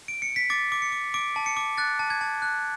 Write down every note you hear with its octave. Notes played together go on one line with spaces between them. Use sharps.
D7
C#7
B6
D6 A6
D6
C#7
D6
D6 D7
A5
C#7
D6
F#6 A6
A5
G#6
A5
F#6